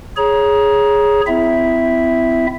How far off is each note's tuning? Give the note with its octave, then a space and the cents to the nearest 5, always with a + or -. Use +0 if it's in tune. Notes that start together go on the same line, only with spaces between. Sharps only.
G#4 +0 C#5 +0 A#5 +25
C4 -40 E4 +15 E5 +0